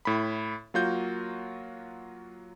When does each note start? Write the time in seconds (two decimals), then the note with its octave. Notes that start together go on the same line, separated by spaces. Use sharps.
0.05 A2 B5
0.74 F#3 A#3 F4 F#4 G6